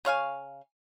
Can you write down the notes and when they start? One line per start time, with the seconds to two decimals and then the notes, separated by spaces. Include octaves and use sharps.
0.05 C#3 C#5 F5 G#5